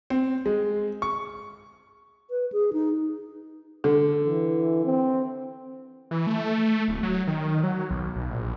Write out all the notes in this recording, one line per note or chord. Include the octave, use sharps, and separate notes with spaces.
C4
G#3
C#6
B4
G#4
D#4
D3
E3
C4
E3
A3
D1
F#3
D#3
F#3
B1
B1
A#1